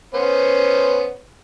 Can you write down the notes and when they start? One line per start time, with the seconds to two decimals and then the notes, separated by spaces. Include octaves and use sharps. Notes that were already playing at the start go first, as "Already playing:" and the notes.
0.14 B3 C#4 C5